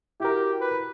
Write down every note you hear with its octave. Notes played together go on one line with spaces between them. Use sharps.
E4 F#4 G4 A#4
B4